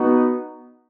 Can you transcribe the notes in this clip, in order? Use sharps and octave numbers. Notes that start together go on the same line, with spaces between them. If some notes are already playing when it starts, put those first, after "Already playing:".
Already playing: B3 D#4 F#4